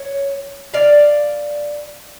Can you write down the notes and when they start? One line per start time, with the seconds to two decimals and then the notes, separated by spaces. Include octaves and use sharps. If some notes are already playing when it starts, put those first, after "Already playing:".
Already playing: C#5
0.74 D5 F5